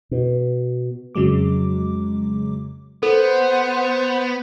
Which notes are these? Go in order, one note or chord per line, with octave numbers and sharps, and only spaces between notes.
B2
F2 C#3 F#3 G#3 D6
B3 A4 C5 F#5